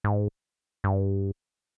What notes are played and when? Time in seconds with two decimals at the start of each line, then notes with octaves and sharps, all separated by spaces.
0.04 G#2
0.84 G2